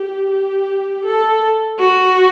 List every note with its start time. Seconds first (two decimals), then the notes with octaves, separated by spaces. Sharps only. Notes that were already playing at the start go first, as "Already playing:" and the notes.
Already playing: G4
0.30 G4
1.05 A4
1.79 F#4